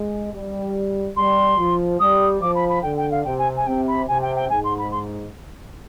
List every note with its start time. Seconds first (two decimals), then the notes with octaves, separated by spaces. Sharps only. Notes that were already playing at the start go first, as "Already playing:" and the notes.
Already playing: G#3
0.33 G3
1.16 G3 C6
1.58 F3
2.00 G3 D#6
2.41 F3 D6
2.55 B5
2.69 B5
2.83 D3 G5
2.97 G5
3.11 F5
3.25 C3 G5
3.38 G#5
3.57 G#5
3.66 C3 G5
3.87 B5
4.08 C3 G#5
4.22 G5
4.36 G5
4.50 G#2 G#5
4.64 C6
4.78 B5
4.91 C6